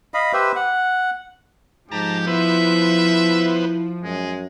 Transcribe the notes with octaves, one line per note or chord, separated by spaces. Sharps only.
D#5 F5 B5
G4 B4 C5 E5
F#5
G#2 F3 G4 A5 A#5
B3 E4 B4 C5 E5
F#2 G#3